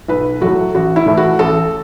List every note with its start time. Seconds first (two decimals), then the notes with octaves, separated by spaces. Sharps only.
0.08 B1 B4
0.41 A2 F#3 A3 F#4
0.75 A1 F#4
0.96 E4
1.06 A2 E3 A3
1.17 F#4
1.39 A1 A4